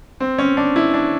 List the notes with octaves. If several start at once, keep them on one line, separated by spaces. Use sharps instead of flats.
C4
C#4
D4
E4
D4